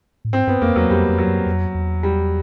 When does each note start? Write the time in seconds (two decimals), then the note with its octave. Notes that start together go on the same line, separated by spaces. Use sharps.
0.25 A2
0.33 G#2 C4
0.47 G2 B3
0.62 F2 A#3
0.76 E2 F#3
0.90 F2 G3
1.09 F2
1.18 F#3
1.27 F#2
1.46 F2
1.75 E2
2.03 G3